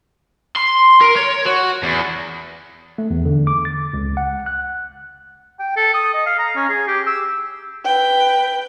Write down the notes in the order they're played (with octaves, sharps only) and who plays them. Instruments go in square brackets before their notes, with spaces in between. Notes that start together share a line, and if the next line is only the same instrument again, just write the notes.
[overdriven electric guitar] C6
A#4
C#5
F#4
E2
[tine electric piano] A3
E2
D3
D6
A6
C#2
F#5
F#6
[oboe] G5
A4
D#6
D#5
F5
A#5
C#4
G#4
G4
E6
[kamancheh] B4 G5